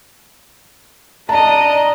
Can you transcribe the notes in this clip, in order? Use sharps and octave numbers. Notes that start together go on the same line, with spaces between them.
D4 D#5 A5 A#5